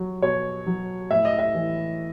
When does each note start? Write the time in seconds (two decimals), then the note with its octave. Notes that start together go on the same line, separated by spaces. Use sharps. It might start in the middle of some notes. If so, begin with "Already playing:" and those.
Already playing: F#3
0.22 B2 C#5
0.66 F#3
1.11 A2 E5
1.25 D#5
1.39 E5
1.54 E3